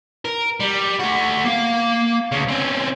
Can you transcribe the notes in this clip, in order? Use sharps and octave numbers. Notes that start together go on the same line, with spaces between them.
A#4
G3
A3 F#4
A#3 F5
D2 C#3
C4 C#4